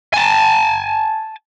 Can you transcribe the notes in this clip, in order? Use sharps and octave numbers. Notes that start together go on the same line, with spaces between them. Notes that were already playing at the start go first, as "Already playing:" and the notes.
G#5 A5